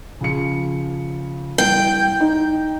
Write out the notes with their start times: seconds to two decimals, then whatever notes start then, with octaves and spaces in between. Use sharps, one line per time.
0.21 C#3 F3 C#7
1.58 C2 G5
2.20 D#4